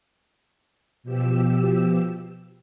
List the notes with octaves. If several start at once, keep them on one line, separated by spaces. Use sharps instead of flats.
B2 F3 G4 E6